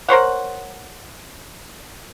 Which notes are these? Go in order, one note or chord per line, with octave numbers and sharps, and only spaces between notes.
A#4 C5 C#5 F#5